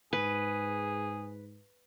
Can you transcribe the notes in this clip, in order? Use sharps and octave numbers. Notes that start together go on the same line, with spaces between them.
G#2 G#4 B4